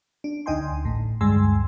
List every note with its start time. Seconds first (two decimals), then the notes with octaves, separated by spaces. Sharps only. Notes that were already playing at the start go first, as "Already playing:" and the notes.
0.24 D4
0.46 D2 D#4 D#5 G5 G#5 C6
0.85 A1 A2
1.21 D2 G2 G#3 G#5 C6 E6